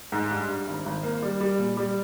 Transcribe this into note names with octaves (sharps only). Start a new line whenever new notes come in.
G#2
G2
G2
G#1
G#1
A#3
G3
G3
A#2
G3